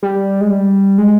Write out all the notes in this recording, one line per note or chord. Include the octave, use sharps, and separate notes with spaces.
G3
G#3
G3
G#3